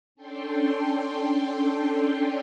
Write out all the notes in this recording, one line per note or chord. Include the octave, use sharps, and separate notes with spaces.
C#4 D4 A4 G5 C6